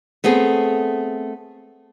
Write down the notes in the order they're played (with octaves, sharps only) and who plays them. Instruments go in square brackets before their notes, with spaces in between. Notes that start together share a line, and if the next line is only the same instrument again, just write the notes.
[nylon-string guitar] A3 B3 C4 G#4